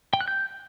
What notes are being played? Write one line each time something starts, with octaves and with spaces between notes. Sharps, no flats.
G5
F#6
G6